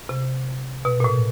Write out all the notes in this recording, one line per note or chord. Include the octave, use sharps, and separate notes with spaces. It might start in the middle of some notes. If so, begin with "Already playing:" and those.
C3
B2
A#2
A2